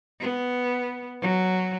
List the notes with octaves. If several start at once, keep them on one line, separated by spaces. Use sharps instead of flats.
B3
F#3